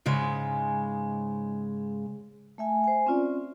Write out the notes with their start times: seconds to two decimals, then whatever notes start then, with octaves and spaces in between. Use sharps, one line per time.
0.06 G#2 C#3 G#3
2.58 A3 E5 G#5
2.84 C5 G#5
3.06 C4 C#4 F4 D5